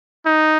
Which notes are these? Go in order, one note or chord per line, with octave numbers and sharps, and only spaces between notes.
D#4